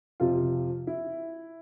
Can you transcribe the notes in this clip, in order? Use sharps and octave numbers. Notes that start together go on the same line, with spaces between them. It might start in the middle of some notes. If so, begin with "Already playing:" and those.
F2 C3 F3 F4
E4